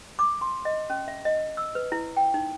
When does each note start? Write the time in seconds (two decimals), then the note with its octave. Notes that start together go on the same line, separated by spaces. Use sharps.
0.19 D6
0.41 C6
0.65 D#5
0.90 C#4
1.08 E5
1.25 D#5
1.57 E6
1.75 B4
1.92 E4
2.17 G5
2.34 D#4